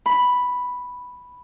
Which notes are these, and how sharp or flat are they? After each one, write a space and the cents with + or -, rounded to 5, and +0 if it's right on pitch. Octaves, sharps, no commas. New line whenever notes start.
B5 +0